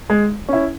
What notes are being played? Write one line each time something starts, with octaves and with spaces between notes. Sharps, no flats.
G#3
C#4 E4